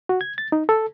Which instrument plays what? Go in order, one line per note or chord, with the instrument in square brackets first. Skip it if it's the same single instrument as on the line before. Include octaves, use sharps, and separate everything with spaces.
[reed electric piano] F#4
G#6
A6
D#4
A4